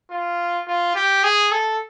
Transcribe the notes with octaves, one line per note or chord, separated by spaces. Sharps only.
F4
F4
G4
G#4
A4